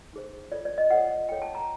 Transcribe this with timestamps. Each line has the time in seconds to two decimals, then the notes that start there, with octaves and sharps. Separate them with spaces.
0.13 D#4 G#4 C5
0.52 F4 A4 C#5 D5
0.65 D5
0.78 D#5
0.90 F4 A4 C#5 F#5
1.29 F4 A4 C#5 G5
1.42 A5
1.55 A#5